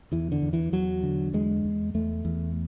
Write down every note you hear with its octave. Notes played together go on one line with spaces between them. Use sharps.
E2 E3
D3
E2
E3
E2 F#3
D3
E2 G#3
E2
E2 A3
E2